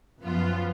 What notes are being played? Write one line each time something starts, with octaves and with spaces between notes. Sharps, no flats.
F#2 F3 B3 F4